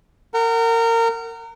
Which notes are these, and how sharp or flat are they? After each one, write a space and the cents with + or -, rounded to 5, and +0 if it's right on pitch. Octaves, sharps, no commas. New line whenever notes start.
A#4 -25 F#5 +20